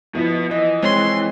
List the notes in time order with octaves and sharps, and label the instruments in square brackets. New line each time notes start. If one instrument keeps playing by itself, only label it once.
[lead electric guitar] B2 B3 [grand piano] F3 E4
[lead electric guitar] E3 [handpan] D#5
[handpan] G#3 C4 C#5 [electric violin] C6